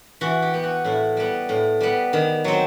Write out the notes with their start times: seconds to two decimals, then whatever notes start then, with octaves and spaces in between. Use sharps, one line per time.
0.21 E3 F#4
0.42 G4
0.54 B3
0.63 F#4
0.85 A2 E4
1.17 G3 B3
1.49 A2
1.81 G3 B3
2.13 D#3
2.44 F#3 C4